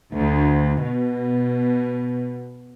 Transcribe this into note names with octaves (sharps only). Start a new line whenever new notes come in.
D2
B2